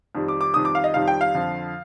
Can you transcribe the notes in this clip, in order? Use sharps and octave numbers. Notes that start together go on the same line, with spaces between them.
F2 D#3 G3
D6
D6
F2 D#3 G3 D#6
D6
F5
D#5
F2 D#3 G3 F5
G5
F5
F2 D3 F3